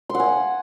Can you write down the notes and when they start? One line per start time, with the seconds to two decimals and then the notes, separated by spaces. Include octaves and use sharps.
0.09 C6
0.14 F#5
0.19 G#5